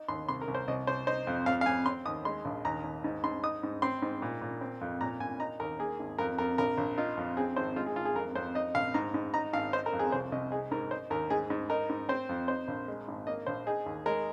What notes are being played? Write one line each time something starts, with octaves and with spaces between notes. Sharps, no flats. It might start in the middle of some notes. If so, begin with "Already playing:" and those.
Already playing: D#4
D#2 C6
C2 C6
A#4
C2
C5
C2 D#5
C2 C5
D#4 C5
F2
F2 F5
F5
F2 G#5
C4 C6
D#2 D#6
G#3 C6
A#1
D#2 A#5
D#2
G#2
G#2 C6
D#4 D#6
G#2
C4 C6
G#2
A#2
A#2
C4
F2
A#2 A#5
A#2 G#5
D#4 A#5
D#2 A#4
A#3 G#4
G#1
F2 A#4
F2 A#4
A#1 A#4
A#1
D#4 F4
F2
C4 G#4
G#1 C5
G#3 F4
G#4
G#1 F4
G#4
F2 A#4
F2 C5
D#4 D#5
A#1 F5
G#2 A#5
G#2
D#4 A#5
G#1 F5
D#4 C5
A#4
F2
G#4
C2 C5
C2 D#5
D#4 G#4
G#2 A#4
D#4 C5
D#2 A#4
G#2 G#4
G#2
D#4 A#4
G#2
C4 C5
F2
D#4 C5
A#1
G#3
G#1
A#3 D#5
A#1 C5
D#4 G#4
D#2
G#3 A#4